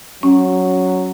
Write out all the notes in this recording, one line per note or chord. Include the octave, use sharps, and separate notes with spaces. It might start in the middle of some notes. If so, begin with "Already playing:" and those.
F#3 C#4